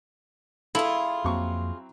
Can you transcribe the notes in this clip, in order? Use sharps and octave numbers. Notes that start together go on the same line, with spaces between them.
E4 F4 G#4 A4
F2 F#3 A#3 C4 C#6